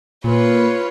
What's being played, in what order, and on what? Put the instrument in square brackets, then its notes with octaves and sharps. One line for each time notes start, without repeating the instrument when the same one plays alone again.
[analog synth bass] A#2 [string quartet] F4 B4 C#5